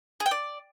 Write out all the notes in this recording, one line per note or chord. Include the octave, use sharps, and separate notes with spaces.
G#4
G5
D5